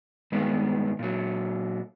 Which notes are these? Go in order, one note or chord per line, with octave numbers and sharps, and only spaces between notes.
G2 D#3 G#3 B3
A#2 F#3